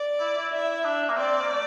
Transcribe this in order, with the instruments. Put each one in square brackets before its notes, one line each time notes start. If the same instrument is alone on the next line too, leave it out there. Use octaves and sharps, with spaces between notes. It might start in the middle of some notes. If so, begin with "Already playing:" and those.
Already playing: [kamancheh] D5
[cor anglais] E4
E4
[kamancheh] E5
[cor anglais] D4
A#3
[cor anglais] C4 [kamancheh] D5
[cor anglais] A#3
A3